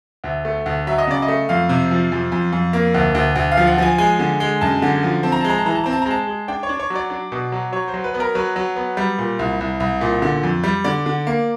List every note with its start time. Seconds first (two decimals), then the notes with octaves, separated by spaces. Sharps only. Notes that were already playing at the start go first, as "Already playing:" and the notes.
0.24 D2 E5
0.45 A3
0.66 D2
0.87 F#3 E5
0.98 D#5
1.07 C#3 D5
1.22 D#5
1.28 A3
1.49 F2 F5
1.69 C3
1.91 F3
2.12 F2
2.32 F2
2.53 F2
2.73 A#3
2.94 D2
3.15 D2
3.36 D2
3.51 F5
3.57 F3
3.67 F#5
3.78 F3 G#5
3.98 G#3 G#5
4.19 D3
4.40 G#3
4.61 F#2 A5
4.82 D3
5.03 F3
5.23 C4 A5
5.32 A#5
5.41 G#3 A5
5.50 A#5
5.58 A5
5.65 E3 A#5
5.75 A5
5.84 C4 A#5
5.93 A5
6.02 A#5
6.06 G#3 A5
6.27 G#3
6.48 D4 G5
6.63 C#5
6.69 D4
6.80 C#5
6.90 F#3
6.95 D5
7.10 D4
7.32 B2
7.52 F#3
7.72 F#3 C#5
7.88 C5
7.94 F#3
8.04 B4
8.14 B3
8.20 A#4
8.35 F#3 B4
8.56 F#3
8.76 B3
8.97 G3
9.18 A#2
9.39 C2
9.61 C2
9.80 C2
10.01 A#2
10.22 D3
10.43 F2
10.64 G3
10.84 D3 D5
11.06 D3
11.27 A#3